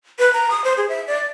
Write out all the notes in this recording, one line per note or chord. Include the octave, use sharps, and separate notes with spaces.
B4
A#5
D#6
C5
G#4
E5
D5